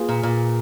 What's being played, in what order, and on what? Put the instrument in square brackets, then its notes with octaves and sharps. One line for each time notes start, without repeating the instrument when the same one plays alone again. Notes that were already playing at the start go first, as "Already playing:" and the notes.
Already playing: [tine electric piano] A#3 F4 G#4 B4
[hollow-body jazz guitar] A#2
A#2